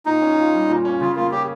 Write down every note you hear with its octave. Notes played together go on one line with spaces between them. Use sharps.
A#2 D#4
C#4
F4
G3
A#2
C#4
C#3 F4
A#3 F4
C#4 G4